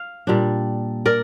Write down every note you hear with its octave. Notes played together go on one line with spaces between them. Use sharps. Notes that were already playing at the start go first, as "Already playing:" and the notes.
Already playing: F5
A#2 G3 D4
A#4 D5